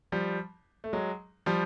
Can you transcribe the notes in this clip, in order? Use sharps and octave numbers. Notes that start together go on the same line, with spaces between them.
F3 G3
A3
F#3 G#3
F3 G3